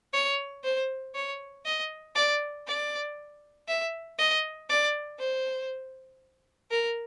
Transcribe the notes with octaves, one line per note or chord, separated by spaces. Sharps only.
C#5
C5
C#5
D#5
D5
D5
E5
D#5
D5
C5
A#4